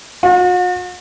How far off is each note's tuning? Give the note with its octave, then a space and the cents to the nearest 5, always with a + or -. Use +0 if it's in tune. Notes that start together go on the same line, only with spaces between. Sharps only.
F#4 -45